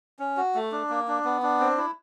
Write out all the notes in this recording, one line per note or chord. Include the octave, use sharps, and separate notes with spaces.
C#4
F#4
A3
D4
A#3
D4
B3
D4
C4
E4